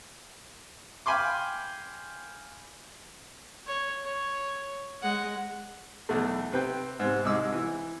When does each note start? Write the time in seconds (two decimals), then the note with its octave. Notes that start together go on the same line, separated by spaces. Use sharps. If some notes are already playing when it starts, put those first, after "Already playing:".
1.06 F5 G5 G#5 B5 C6 D6
3.67 C#5
4.04 C#5
5.03 G#3 F#5
6.09 B1 E2 A3
6.53 C3 B4 G5
7.00 G#2 C3
7.24 C2 G#3 D#4 D6 E6
7.52 E3